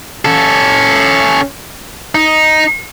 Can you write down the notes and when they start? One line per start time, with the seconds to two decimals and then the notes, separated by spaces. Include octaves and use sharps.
0.25 C#4 A4
2.15 D#4